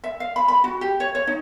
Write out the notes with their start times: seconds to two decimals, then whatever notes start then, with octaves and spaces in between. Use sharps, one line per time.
0.04 E5
0.20 F5
0.36 B5
0.48 B5
0.64 F#4
0.81 G4
1.00 C#5
1.15 C#5
1.27 D#4